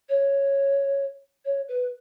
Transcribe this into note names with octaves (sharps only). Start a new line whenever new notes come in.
C#5
C#5
B4